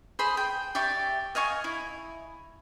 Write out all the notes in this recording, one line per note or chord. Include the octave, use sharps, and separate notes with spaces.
G#4 C5 B5 C6
G5
G4 D5 E5 C#6
D#5 F5 G#5 C#6
E4